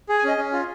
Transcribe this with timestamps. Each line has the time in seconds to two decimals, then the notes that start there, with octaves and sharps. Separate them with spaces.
0.09 G#4
0.19 G#5
0.24 C#4 D#5
0.38 C#4
0.53 F4